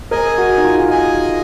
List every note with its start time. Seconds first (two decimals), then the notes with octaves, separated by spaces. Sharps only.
0.11 G#4 A#4 D#5 G#5
0.38 F#4
0.57 D#4
0.65 F4
0.90 G#4 D#5 G#5